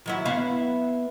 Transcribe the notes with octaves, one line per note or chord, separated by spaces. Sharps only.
D#3 F#3 E4
B3 E4 F5